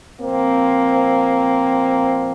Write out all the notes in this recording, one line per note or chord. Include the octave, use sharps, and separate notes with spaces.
A#2 F3 A#3 C4